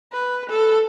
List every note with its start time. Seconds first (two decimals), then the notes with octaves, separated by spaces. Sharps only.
0.13 B4
0.50 A4